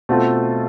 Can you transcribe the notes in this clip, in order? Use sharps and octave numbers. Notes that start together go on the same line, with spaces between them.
B2 A3 C4 F4 A4